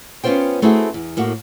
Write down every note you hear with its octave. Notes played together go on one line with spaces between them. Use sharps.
B3 C#4 D4 F4 C5 G5
A3 C4 E4 F#4 G#4
E2
A2 A#3 F#4